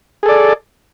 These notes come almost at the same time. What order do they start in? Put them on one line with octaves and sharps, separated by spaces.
G#4 A4 D5